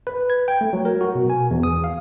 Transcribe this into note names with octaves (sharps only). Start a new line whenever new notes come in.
B4
G#6
G5
A3
F#3
A#4
F#4
B2
G#5
E2
D#6
F5